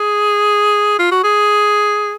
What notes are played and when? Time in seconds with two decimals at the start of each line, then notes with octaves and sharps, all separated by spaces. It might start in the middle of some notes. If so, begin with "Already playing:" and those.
Already playing: G#4
0.99 F4
1.11 F#4
1.24 G#4